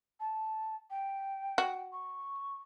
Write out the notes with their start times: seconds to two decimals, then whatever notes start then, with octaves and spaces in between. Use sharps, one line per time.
0.20 A5
0.90 G5
1.58 F#4
1.92 C#6